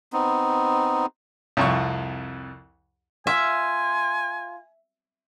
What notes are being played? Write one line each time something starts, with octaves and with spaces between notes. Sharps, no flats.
B3 C4 D#4
C2 F2 C#6
F4 E5 G#5